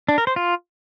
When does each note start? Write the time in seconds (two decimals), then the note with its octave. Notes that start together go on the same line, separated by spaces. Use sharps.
0.09 D4
0.18 A#4
0.27 C5
0.36 F4